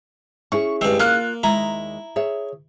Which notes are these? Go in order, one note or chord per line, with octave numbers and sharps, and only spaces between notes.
C#4 E4 G#4 C#6
G2 G#3 C4
A#3 F4 F6 F#6
D#2 G#3 E4 A#5
G#4 C#5 E5